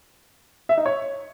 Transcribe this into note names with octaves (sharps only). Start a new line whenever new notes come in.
E5
D#4
C#5